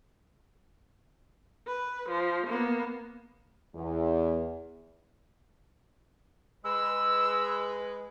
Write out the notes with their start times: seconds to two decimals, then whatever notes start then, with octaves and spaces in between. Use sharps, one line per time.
1.67 B4
2.09 F3
2.47 A#3 B3
3.74 E2
6.64 G#3 B4 E6